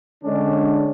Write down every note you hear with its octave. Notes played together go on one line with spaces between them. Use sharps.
D3 G#3 C#4 D4